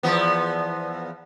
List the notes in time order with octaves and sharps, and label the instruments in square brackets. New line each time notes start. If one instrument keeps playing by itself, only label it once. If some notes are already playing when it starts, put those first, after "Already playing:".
[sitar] E2 F3 B3